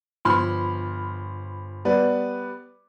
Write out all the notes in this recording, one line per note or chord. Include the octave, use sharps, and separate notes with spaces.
G1 F3 B5 C6 F6
G3 B3 B4 D5